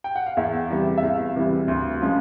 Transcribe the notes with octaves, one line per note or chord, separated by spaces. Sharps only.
G5
F#5
F5
E2 E5
C3 E3 G3
E5
E2 F5
C3 E3 G3
D2
C#3 F3 G#3